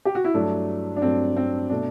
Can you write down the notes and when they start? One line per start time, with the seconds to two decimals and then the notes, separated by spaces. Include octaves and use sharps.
0.05 G4
0.15 F#4
0.24 E4
0.34 G2 F#3 A3 D4
0.97 D4
1.02 G2 F#3 A3 C4
1.37 C4
1.70 B2 A3 D4